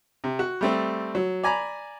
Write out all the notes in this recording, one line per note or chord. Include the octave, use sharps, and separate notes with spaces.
C3
F#4
G3 A3 C4
F#3
D5 G#5 A#5 B5